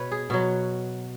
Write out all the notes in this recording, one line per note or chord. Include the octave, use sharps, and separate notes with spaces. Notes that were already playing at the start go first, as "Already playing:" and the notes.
Already playing: B2 B4 C#5
G#4
B2 F#3 F#4